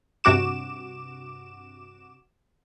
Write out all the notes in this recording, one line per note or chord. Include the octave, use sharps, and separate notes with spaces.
G2 C3 F#4 D6 E7